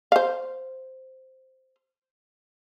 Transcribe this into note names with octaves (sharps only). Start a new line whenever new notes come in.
C5 F5